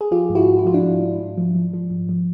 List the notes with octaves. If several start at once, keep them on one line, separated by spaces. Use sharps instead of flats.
G#4
F3 F4 G4
G#2
E4 F#4
G#2
E4
F3 F4
D4 E4
G#2
G#2
G#2
F3
F3
F3
G#2
F3